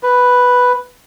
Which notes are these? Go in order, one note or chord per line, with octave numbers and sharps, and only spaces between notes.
B4